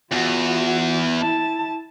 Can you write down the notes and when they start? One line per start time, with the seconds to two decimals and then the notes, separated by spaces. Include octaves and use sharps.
0.12 E2 F4 F#4
1.19 E4 A5